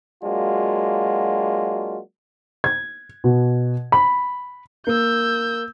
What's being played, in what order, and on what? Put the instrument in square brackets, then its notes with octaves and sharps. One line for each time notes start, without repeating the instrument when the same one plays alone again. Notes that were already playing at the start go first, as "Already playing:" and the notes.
[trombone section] F#3 G#3 A#3 D4 F4 F#4
[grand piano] G#6
B2
B5
[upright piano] A#3 [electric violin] E6 G6